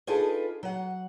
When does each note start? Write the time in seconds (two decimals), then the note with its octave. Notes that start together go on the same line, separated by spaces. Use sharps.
0.07 D4 D#4 F4 G#4 A4 B4
0.63 F#3 F#5